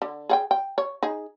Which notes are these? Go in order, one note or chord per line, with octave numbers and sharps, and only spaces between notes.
D3
G#4 F#5 G5
G5
C#5
D#4 G#4